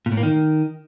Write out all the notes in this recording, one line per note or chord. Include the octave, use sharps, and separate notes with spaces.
A#2
A2
A#3
D#3